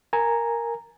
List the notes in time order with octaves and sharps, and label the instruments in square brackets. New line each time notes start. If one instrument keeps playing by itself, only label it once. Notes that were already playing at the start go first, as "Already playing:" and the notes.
[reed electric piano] A#4 G#5 A#5